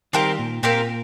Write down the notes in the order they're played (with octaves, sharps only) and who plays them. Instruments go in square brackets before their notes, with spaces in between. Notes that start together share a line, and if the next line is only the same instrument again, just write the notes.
[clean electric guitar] D#3 G3 [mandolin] C4 G4 A#4 F5
[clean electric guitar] A#2
[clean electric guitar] A#2 [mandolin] C4 G4 A#4 F5